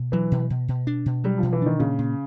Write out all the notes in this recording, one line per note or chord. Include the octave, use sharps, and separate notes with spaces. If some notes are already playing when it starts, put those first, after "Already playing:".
Already playing: B2
E3 F#3
B2
B2
B2
D4
B2
F#3 G3
B2 F3
E3
D#3 D4
A#2 C#3
A#2